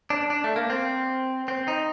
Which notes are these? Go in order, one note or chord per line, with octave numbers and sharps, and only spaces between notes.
D4
D4
A3
A#3
C4
C4
D#4